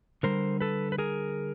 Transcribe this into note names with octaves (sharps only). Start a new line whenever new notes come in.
D3 G3 A#4 C5
A4 B4
B4
G#4 A#4